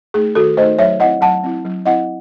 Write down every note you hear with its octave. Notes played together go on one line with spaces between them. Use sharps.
A3 D#4 G#4
D#3 F#4 A4
A3 D#4 C5 D#5
F#3 C#5 E5
C4 E4 D#5 F#5
F#3 F#5 A5
C4 E4
F#3
C4 E4 D#5 F#5